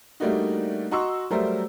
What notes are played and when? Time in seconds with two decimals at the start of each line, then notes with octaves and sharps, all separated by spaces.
0.20 G3 A3 A#3 D4 D#4 F#4
0.91 F#4 D#5 A#5 C6 C#6 E6
1.31 F#3 G3 A3 A#4 C5 E5